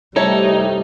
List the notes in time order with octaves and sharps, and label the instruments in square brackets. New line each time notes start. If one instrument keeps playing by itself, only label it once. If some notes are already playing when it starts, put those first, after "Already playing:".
[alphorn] C3 [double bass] G3 A3 [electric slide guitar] D#4 [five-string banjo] E4 A4 C#5